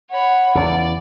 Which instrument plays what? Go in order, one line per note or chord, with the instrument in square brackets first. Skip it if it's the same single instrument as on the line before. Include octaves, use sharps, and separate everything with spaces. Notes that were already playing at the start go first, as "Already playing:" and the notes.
[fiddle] C#5 B5 [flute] F#5
[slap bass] E2 C#3 E3 [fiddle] D5